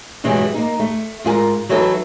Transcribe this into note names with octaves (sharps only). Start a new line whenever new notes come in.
G2 B2 E3 F#3 G#3
A#3 D#4
A3
G#2 F4 G#4 A#4
E3 F#3 D#4 E4 A4 B4